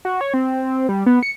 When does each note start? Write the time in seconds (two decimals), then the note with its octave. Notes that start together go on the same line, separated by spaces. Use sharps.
0.05 F#4
0.21 C#5
0.34 C4
0.89 G3
1.06 B3
1.23 C#7